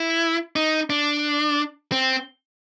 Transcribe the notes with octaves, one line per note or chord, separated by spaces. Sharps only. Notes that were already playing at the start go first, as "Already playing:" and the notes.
Already playing: E4
D#4
D4
C4